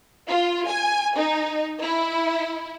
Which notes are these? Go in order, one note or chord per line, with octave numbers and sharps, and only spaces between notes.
F4
G#5
D#4
E4